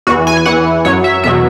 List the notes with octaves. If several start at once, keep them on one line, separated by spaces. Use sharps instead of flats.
E2 E3 F#4
G#5
G#5
E2 E3 F#5
F#2 F#3 C#5
E5
E2 B2 F#3 E5